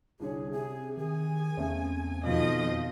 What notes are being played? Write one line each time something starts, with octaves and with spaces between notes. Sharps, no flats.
C2 D3 G#4 C#5
C3 G#4
D#3 G#4 G#5
E2 C#3 A3 C4
F2 B2 D#3 F3 D#5 F5